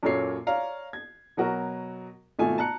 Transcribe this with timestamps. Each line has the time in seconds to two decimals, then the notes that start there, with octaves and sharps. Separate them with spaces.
0.03 F#2 A#2 A#3 A4 C#5 C7
0.47 C#5 D5 F5 A#5
0.93 G#6
1.37 B2 F#3 F#4 A#4
2.39 G#1 B2 A3 F4 G#5
2.58 A5 A#5 F#6 C#7